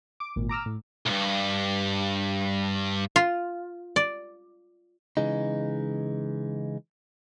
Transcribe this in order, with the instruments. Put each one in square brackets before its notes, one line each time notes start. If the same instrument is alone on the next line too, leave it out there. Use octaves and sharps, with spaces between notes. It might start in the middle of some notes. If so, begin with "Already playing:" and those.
[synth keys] D6
G#1 A#2
A#5 D6 E6 F6
A2
[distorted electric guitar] C2 G2
[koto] F4
D5
[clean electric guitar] C#3 E3 G#3 D#4